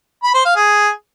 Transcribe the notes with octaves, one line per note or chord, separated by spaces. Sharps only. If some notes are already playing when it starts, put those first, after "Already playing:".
B5
C5
F5
G#4